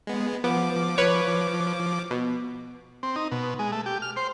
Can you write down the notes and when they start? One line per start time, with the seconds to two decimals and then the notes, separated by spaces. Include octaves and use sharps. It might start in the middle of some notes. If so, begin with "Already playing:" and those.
0.07 G#3 B3
0.44 F3 B3 D6
0.98 B4 C#5
2.11 B2
3.03 C4
3.16 D#4
3.31 B2
3.59 G#3
3.72 A3
3.86 G4
4.02 F6
4.16 C5